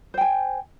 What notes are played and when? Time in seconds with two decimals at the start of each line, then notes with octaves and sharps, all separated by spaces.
0.14 C5
0.18 G5
0.21 G#5